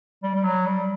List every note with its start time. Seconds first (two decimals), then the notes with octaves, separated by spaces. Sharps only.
0.23 G3
0.35 G3
0.43 F#3
0.66 G3